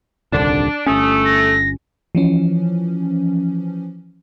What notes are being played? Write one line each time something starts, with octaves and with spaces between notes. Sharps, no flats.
D#1 C2 D3 D4
G1 A3 C#4 D#6
A#6
E3 F3 C#4